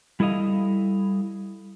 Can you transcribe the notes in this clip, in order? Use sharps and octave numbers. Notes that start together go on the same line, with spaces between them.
G3 E4 A4 D#5 F5